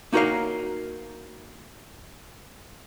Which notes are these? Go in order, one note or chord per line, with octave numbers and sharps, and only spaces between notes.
A#3 D#4 F#4 A#4 C#5 F5